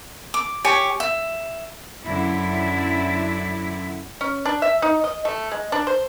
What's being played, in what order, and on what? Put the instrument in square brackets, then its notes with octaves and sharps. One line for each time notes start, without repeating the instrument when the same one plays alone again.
[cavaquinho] D6
G4 C#5 G#5 C#6
E5
[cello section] F#2 D3 E4
[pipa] C#4
D4
E5
D#4
D#5
A3
G#3
D4
C5